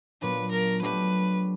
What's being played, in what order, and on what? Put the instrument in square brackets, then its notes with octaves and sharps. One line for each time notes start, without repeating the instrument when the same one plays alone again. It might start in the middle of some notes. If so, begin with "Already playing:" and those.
[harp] A#2 F#3 B3 D4 F4 [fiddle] B4
[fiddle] A#4
[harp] F#3 A3 D4 G4 [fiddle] B4